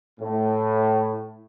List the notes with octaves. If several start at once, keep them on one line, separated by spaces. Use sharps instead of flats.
A2